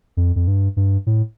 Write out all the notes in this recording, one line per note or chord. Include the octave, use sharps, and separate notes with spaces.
F2
F2
G2
G2
A2